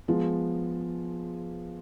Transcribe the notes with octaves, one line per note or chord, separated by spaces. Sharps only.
F3 G#3 B3